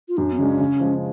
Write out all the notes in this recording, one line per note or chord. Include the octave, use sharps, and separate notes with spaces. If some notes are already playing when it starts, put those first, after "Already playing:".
F4
F#2 D4
B3
C#3 G#3 C#4 D4
C#3
F3 G#3